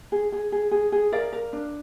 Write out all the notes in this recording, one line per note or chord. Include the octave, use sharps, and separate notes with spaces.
G#4
G#4
G#4
G#4
G#4
A#4 D5 F5
A#4
D4